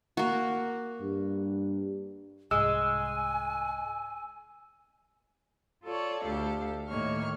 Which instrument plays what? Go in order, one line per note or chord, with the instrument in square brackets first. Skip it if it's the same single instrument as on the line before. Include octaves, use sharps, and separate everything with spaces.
[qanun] A#3 F#4
[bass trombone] G2
[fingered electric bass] C2 G#2 [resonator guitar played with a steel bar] G#3 [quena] G#5 [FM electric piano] E6
[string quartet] F4 A4 C#5 D5
D2 G4 A4 F5
A2 D#3 A#3 C#5 F6